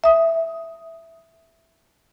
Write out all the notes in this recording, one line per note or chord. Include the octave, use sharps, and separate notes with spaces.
E5 D#6